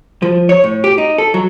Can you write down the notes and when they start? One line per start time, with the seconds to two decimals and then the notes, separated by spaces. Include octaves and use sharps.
0.22 F3
0.49 C#5
0.64 A2
0.84 G4
0.98 D#4
1.18 A4
1.34 F#3